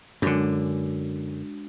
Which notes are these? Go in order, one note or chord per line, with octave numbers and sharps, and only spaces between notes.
F#2 D3 G#3 D4 F#4